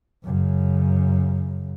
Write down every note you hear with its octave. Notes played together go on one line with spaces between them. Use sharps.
F#2 C#3